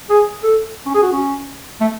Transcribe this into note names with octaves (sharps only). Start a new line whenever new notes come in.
G#4
A4
C#4
G#4
F#4
C#4
A3